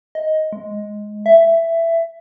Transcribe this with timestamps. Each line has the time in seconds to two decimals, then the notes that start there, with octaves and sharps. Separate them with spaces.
0.15 D#5
0.52 G#3
1.26 E5